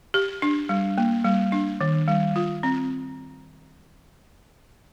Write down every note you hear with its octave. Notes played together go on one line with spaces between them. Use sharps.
G4
D4
G3
A#3
G3
D4
D#3
G3
F4
C4